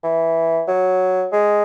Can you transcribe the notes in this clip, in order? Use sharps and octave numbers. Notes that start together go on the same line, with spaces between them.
E3
F#3
G#3